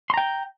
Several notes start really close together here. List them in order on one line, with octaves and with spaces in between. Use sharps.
C6 A#5 G5